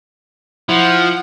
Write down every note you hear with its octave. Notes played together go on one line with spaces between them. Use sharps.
F3 E4 F#5